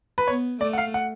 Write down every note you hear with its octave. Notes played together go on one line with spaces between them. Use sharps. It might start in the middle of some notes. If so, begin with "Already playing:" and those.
B4
B3 C#5
A3 D5
F#5
F5
F#5